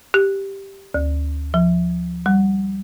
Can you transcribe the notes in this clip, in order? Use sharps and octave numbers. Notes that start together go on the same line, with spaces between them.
G4
D2
F3
G3